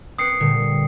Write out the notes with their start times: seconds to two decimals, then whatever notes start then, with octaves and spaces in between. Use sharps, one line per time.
0.19 C4 B4 D#6 C7 C#7
0.40 A#2 D3 G3